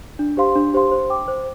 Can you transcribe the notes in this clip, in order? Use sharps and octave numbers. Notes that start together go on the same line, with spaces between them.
D4
G4 C5 F5 C6
D4
G4 C5 F5 C6
C5
G5 D6
C5